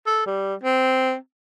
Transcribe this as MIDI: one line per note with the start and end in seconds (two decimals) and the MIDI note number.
0.07 0.22 69
0.27 0.54 55
0.64 1.15 60